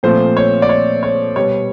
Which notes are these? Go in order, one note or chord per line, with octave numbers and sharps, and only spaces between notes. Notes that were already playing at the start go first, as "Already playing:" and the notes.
A#2 F3 A3 C4 C5
C#5
D5
C#5
C#5
B2 G3 B3 C#5